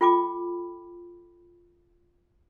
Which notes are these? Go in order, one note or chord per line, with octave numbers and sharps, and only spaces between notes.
F4 A4 G5 B5 D6